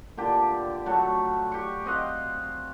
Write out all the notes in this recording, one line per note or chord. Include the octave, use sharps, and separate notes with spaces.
A#2 D3 G4
F#3 A3 F#4
G4 C#6
C4 D#5 F5 F#5